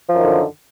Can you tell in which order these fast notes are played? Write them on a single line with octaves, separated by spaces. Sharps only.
F3 F#2 D#3 D3